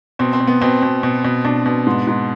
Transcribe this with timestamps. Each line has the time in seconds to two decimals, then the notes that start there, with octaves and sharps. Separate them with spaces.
0.19 B2 C4
0.33 C4
0.40 B2
0.47 B3
0.61 B2 C4
0.82 B2
1.03 B2
1.24 B2
1.45 B2 D4
1.66 B2
1.87 G#2
2.07 G#2